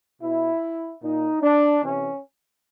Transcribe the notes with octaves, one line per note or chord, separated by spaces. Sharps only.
B2 E4
A#2 D#4
D4
C3 E3 C#4